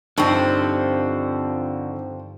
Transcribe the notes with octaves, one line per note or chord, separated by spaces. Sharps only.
G2 D3 F3 C4 D#4 C#6